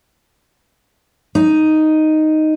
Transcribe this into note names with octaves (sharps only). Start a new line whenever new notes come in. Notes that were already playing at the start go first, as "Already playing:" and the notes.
D#4